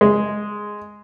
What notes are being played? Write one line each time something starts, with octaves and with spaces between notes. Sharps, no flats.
G#3